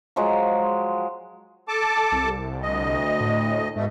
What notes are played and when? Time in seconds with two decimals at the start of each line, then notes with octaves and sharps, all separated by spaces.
0.16 F3 F#3 G#3
1.68 A4 A5 D6
2.12 C2
2.63 D2 D#5
3.20 A2
3.76 G#2 B2 A3